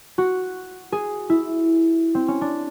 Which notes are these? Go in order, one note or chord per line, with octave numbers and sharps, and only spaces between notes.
F#4
G#4
E4
C4
C#4
D4